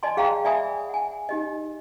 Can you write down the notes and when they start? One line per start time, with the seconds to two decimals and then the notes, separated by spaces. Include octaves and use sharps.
0.03 D5 D#5 G#5 A5 C6
0.17 G#4 F5 G5 A#5 C6
0.45 D5 E5 G#5 B5 D#6
0.89 F#5 G#5
1.29 D#4 G4 D#5